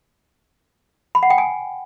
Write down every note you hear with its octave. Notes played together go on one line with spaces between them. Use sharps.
B5
F#5
G5
G#5